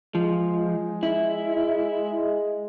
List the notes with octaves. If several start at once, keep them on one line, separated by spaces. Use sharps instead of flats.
F3 G#3
E4